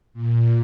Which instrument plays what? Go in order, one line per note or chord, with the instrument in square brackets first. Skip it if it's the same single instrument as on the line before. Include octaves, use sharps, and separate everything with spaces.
[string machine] A#2